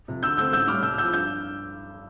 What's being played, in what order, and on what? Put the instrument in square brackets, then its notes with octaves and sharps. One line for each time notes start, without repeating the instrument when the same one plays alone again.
[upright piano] F2 C3
D2 E6 G6
D3 A3 C4 E6 G6
A1 E6 G6
A2 G3 D6 F6
C2 E6 G6
F6
C3 F3 E6 G6
G2 E6 G6